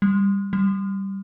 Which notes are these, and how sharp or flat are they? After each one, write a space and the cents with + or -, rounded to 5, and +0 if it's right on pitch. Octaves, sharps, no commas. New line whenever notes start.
G3 +10
G3 -10